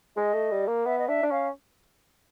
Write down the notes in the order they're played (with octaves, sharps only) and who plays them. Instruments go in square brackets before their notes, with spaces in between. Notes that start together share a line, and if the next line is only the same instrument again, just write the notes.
[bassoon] G#3 [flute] D#5
[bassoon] A3
G3
A#3
[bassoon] B3 [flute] E5
[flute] D#5
[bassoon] D4 [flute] E5
[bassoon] D4
[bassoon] C#4 [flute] F5